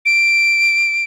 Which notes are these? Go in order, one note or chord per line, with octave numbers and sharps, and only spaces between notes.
D7